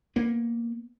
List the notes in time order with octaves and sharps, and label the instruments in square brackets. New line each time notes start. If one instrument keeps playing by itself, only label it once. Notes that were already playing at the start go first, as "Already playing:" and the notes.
[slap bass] A#3 B3